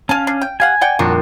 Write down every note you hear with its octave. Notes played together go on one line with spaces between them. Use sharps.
C#4 F5 G#5 A5
D4
G5
G4 F5 F#5 G#5
D5 F#5 G5
A#1 F2 F#3 D4 F#4